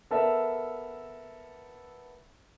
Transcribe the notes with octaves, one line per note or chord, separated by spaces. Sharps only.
B3 A4 A#4 E5